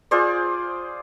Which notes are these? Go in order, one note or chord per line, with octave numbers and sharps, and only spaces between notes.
F4 G#4 C5 D5